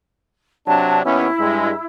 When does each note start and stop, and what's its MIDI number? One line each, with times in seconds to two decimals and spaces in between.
0.67 1.02 48
0.67 1.02 54
0.67 1.02 62
0.67 1.00 81
1.04 1.27 39
1.04 1.27 59
1.04 1.27 61
1.04 1.85 64
1.39 1.71 43
1.39 1.71 56